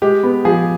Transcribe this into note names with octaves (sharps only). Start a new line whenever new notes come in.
G#3 G4
B3
F3 G#4